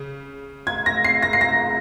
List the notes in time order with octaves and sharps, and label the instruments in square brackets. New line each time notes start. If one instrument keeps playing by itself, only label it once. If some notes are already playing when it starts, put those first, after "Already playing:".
Already playing: [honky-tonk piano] C#3
G#6
A#6
C7
A#6
C7
A#6